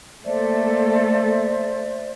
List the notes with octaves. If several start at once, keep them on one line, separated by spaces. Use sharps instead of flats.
A3 A#3 A4 C5 D5 E5